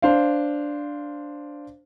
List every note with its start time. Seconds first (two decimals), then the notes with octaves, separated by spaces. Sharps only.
0.02 D4 C5 F5